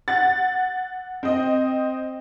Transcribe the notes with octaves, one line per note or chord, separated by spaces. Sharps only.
F#5 A6
C4 D#5